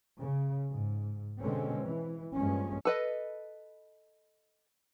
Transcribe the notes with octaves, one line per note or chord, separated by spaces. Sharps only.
C#3
G#2
B2 D3 G#3 C4 C#4
E3
G2 F3 G#3 A#3 C#4
A4 B4 D#5